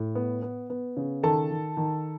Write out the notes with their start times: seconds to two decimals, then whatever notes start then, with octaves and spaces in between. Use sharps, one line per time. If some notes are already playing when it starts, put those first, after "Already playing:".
Already playing: A2
0.15 B3
0.42 B3
0.70 B3
0.97 C#3
1.23 D#3 A4 A5
1.50 D#3
1.77 D#3